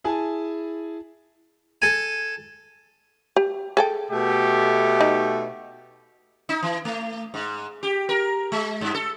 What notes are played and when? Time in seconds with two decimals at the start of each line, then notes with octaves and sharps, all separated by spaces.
0.04 E4 G#4 G#5 A5
1.82 A4 G#5
3.36 G4
3.77 G#4 A4 G5
4.10 B2 A3 G4
5.00 D#4
6.49 D#4
6.62 E3
6.85 A3
7.34 G#2
7.83 G4
8.09 A#4
8.52 G#3
8.81 G2
8.94 A4